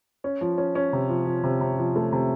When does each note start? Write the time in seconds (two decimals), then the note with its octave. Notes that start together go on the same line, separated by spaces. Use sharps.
0.24 C#4
0.41 F3
0.58 C#4
0.75 C#4
0.93 C3
1.09 F3
1.26 F3
1.44 C3
1.61 C3
1.78 F3
1.96 A3
2.13 C3